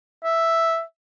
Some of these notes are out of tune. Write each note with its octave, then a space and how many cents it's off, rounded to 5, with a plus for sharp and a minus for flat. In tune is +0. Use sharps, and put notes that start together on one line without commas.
E5 +0